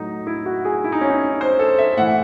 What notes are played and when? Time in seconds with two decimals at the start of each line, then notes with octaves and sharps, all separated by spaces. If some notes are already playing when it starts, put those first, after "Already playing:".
Already playing: A2 F#3 D#4
0.27 E4
0.46 F#4
0.65 G#4
0.84 E4
0.92 D#4
1.01 C#4
1.10 D#4
1.41 C5
1.59 A4
1.79 E5
1.97 A2 E3 F#5